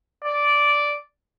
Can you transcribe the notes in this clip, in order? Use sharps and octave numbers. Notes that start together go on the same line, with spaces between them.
D5